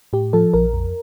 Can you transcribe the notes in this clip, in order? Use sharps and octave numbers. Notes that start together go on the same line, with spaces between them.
A2 G4
F3 A4
A#1 A#4
F2